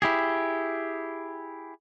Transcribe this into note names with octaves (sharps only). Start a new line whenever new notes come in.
E4 G4 G#4